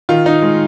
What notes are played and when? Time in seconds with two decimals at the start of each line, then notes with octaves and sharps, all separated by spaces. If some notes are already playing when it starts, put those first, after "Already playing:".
0.09 D#3 F4
0.26 D#4
0.42 G#3